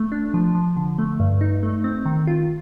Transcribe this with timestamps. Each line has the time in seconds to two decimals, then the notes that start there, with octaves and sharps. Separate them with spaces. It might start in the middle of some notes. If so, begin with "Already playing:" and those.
Already playing: A3
0.12 D4
0.34 F3
0.55 F3
0.76 D3
0.98 A3
1.20 G2
1.41 D#4
1.63 A3
1.84 C4
2.05 D#3
2.27 F4